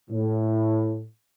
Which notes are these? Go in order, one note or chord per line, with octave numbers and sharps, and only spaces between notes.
A2